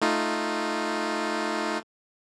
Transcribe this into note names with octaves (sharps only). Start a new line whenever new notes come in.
A3 D#4 F4